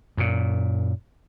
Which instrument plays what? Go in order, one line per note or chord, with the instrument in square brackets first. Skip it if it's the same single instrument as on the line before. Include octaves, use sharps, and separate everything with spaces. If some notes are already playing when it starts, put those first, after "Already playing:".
[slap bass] F#2 A#2